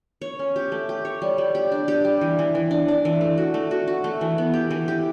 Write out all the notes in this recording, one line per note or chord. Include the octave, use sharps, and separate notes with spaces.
C#5
C#4
G4
A3
G4
C#5
G3
G3
G4
D4
G4
G3
E3
E3
E3
D4
D4
E3
A3
F#4
A3
F#4
F#4
A3
E3
B3
G4
E3
G4